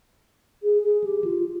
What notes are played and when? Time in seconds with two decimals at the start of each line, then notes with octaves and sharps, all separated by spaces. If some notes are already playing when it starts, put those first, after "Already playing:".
0.63 G#4
0.84 G#4
1.04 G4
1.24 F4